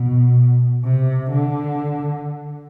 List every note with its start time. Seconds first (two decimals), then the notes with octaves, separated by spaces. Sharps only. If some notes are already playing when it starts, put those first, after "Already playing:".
Already playing: B2
0.84 C3
1.31 D3